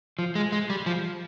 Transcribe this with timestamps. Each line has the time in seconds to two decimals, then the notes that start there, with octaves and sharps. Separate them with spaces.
0.19 F3
0.35 G#3
0.52 G#3
0.70 G3
0.86 F3